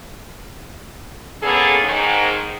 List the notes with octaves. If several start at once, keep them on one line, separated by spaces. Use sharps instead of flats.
A#3 B3 C#4 G#4 A4
G#2 D#3